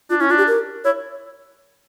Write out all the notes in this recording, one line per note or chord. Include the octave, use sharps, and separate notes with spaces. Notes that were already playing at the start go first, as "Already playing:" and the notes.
D4 F4
C#4 E4
D4 F4
G4
A#4
E4 C#5